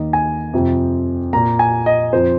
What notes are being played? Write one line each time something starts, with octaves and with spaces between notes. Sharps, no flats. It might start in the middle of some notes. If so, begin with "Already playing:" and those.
Already playing: D#2 D#3 A#3 D#5
G#5
F2 C3 F3 C4
A#2 A#3 A#5
G#5
D#5
F2 F3 C4 C5